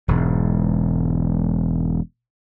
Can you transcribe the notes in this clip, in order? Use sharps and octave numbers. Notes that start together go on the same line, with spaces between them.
E1 G#2